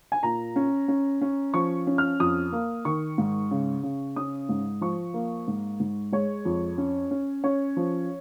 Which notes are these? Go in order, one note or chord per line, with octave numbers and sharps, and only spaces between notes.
G#5
A#2 A#5
C#4
C#4
C#4
F3 C#6
C#4
F6
F2 D#6
A#3
D#3 C#6
G#2
C#3
C#3
C#4 D#6
G#2
F3 C#6
A#3
G#2
G#2
G#3 C#5
F2
C#4
C#4
C#4 C#5
F3